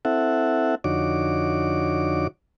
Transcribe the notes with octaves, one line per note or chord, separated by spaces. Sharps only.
C4 E4 A4 E5 F#5
F2 D3 D#4 F#4 C#5 D6